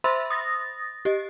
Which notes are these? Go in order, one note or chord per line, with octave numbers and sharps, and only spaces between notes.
C5 E5 B5 C6 E6 A6
D#6 A6 A#6
G4 D#5